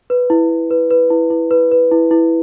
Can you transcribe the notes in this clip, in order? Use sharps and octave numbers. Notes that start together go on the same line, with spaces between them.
B4
E4
E4
B4
B4
E4
E4
B4
B4
E4
E4